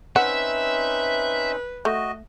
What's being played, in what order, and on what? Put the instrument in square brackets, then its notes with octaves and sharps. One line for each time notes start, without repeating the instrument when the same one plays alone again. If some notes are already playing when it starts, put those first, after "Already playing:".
[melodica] C4 C#4 D#4 [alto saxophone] B4 [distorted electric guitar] E5 [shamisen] F#5
[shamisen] A3 [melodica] F#4 D#5